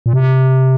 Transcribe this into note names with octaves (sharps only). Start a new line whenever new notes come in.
A#2
C3